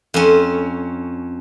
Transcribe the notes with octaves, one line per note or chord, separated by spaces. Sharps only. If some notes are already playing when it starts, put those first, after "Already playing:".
F2 C#4